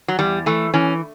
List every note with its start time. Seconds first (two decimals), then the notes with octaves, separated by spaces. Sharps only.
0.08 F#3
0.19 E2 G3
0.46 E3 A3
0.74 E3 C#4